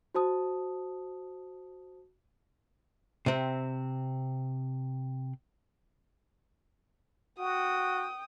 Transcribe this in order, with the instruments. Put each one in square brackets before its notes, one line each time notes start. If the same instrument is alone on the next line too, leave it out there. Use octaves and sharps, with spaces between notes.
[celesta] F#4 C5 A5 D#6
[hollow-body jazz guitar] C3 C4
[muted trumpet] F#4 [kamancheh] G5 D#6